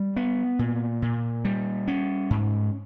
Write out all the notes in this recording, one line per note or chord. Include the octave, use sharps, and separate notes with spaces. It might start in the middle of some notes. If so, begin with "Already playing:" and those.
Already playing: G3
B3
A#2
A#2
G3
C#4
G#2